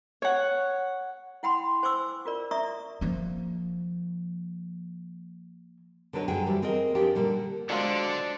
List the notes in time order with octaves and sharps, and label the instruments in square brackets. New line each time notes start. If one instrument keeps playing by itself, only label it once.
[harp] C#5 F#5
[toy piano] E4 F#5 G5 B5 C6
C5 G#5 C#6 D6 E6
F4 A#4 D5
D5 E5 A#5 C#6 D#6
[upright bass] F3 A#3
[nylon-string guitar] D3 F#3 D4 B4 C#5 D#5
G2 D3 F#3 D4 G#4 G5
E3 G3 G4 C5
C4 G#4 A#4 D#5
F3 G#3 D4 G4 A#4 G5
A#2 D3 G3
[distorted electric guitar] D3 [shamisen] F#3 F4 [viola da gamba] G#3 C5 D5 [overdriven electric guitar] D4